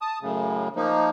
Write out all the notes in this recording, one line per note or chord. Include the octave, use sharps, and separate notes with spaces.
A5 D#6
F#2 A2 C#3
F3 A#3 D#4